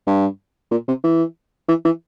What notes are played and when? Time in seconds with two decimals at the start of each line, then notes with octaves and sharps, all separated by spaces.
0.06 G2
0.71 A#2
0.88 C3
1.04 E3
1.68 E3
1.85 E3